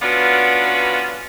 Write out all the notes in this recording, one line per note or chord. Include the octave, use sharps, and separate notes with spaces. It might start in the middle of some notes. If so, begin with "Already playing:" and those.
B3 C#4 D4 F4 F#4 B4